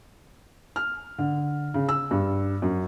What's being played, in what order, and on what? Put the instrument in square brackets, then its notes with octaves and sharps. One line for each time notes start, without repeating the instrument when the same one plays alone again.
[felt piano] F6
D3
C#3
E6
G2
F#2